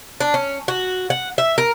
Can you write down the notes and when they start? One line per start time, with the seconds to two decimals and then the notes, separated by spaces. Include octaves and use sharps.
0.20 D4
0.34 C#4
0.68 F#4
1.10 F#5
1.38 E5
1.58 A#4